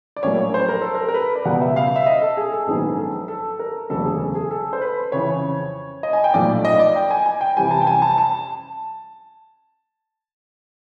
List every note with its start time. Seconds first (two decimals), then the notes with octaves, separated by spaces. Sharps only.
0.16 D5
0.23 A#1 A2 F#3 A#3 C#5
0.54 C5
0.69 A#4
0.81 A4
0.94 A#4
1.08 A#4
1.14 B4
1.36 D5
1.45 C#2 B2 G3 B3 F#5
1.61 E5
1.76 F5
1.96 E5
2.06 D#5
2.21 A4
2.37 G#4
2.52 A4
2.67 A#1 G#2 D#3 F#3 B3 G#4
2.99 A4
3.28 A4
3.59 A#4
3.89 E1 D2 C#3 F#3 A#3 A4
4.05 G#4
4.20 A4
4.35 G#4
4.51 A4
4.73 C5
4.81 B4
5.12 F2 C#3 E3 C#5
6.03 D#5
6.13 G#5
6.24 G5
6.34 B1 A#2 F3 A3 D5
6.50 D5
6.65 D#5
6.79 D5
6.96 G5
7.11 G#5
7.26 G#5
7.41 G5
7.57 F2 C3 E3 G3 G#5
7.71 A5
7.81 G5
7.87 G#5
8.02 A5
8.18 A5